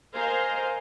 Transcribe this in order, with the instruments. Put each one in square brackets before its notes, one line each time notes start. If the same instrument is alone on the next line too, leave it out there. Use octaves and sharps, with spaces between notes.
[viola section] A#4 C5 D#5 F5 G#5 A#5